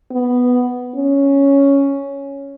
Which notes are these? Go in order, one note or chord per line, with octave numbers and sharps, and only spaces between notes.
B3
C#4